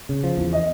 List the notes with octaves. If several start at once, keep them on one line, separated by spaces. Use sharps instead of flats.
C#3
F3
E2
D#5